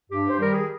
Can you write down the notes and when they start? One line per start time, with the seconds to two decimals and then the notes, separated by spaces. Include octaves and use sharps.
0.10 G2 G4
0.29 C5
0.37 D#3 G3 A#4
0.53 G#4